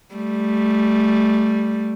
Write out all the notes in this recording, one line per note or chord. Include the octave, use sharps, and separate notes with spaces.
G3 A3